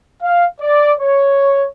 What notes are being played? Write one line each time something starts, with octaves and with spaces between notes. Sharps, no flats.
F5
D5
C#5